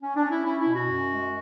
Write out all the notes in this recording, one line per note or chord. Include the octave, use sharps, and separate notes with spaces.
C#4
D4
C#4
E4
C#4 E4
E4
B2
F#4
F#2
G#3